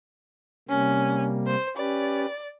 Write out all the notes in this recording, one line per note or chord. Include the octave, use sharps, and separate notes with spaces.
C3 G3 A#3 C#4
C5
C#4 G4 B4 D5